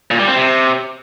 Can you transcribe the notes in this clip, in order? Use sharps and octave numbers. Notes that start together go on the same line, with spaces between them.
A#2
G3
C4
C3